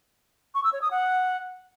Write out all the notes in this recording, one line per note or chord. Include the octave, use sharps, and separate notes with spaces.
C#6
E6
C#5
D#6
F#5